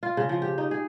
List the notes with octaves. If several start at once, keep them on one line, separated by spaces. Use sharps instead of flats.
F4
C#3
F3
G4
D#4
G#4